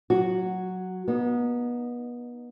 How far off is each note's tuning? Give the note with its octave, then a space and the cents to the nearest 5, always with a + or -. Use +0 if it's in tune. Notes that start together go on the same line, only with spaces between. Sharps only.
F#3 +0 F#4 +0
B3 -30 D#4 -10